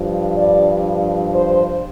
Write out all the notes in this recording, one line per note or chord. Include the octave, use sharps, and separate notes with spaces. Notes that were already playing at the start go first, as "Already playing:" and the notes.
Already playing: G2 F3
D5
C5